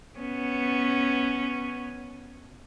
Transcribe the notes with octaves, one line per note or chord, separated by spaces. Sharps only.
B3 C#4